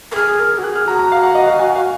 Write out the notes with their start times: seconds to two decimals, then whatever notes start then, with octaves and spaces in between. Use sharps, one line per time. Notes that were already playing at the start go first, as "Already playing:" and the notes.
0.12 A#4
0.15 G#4 F6
0.40 A#4
0.58 F#4
0.63 G#4 F#6
0.76 F6
0.87 F#4 A#5
0.99 A#5
1.12 F5
1.23 F#5
1.35 D#5
1.47 F5
1.59 G#5
1.75 F5